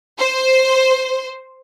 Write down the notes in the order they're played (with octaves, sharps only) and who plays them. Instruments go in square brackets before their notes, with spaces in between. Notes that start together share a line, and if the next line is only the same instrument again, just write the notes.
[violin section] C5